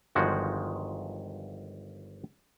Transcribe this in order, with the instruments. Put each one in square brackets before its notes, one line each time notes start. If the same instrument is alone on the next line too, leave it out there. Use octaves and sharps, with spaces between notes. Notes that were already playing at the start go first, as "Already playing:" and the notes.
[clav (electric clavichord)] G1 D#3 F3 G#3 F#4